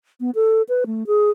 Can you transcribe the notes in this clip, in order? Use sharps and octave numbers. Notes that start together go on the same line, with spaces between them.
B3
A4
B4
A3
G#4